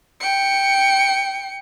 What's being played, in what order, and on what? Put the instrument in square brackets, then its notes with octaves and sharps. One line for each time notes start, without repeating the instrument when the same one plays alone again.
[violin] G5 C#7